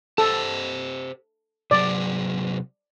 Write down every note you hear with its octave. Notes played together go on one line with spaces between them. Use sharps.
G4 A4 C5 A5
C3 F#3 G#4 D5